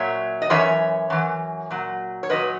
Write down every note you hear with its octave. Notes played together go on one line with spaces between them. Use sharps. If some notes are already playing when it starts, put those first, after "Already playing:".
Already playing: A#2 F#3 C#5 E5
D#5
F#2 E3 C#5 E5
F#2 E3
A#2 F#3
C#5
A#2 F#3 B4 D#5